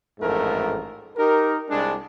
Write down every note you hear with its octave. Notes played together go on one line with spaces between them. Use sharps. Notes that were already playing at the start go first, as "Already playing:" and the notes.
A1 F2 G#2 A3 A#4
D#4 G4 A#4
C2 G#3 D4